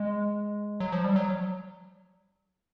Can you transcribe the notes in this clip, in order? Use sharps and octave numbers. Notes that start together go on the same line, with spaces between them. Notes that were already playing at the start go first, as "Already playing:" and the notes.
Already playing: G#3
F#3
F3
G3
F#3